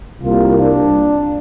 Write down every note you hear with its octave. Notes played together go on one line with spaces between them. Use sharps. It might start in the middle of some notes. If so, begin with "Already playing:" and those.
C2 C3 G3 A#3 F4
D4